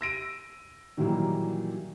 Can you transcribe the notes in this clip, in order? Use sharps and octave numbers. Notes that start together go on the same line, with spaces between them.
E6 A#6 D7 D#7
A#2 D#3 E3 F#3 G3 A#3